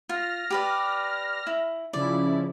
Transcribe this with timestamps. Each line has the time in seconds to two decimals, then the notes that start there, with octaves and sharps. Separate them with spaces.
0.09 F4 F6 A#6
0.50 G4 B4 D5
1.47 E4
1.93 C#3 F3 E4 D5